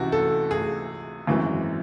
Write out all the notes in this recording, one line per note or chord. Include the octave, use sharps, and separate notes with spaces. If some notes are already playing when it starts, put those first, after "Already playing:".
Already playing: C#2 C3 E3 F#4
A4
G#4
G#1 F#2 E3 G#3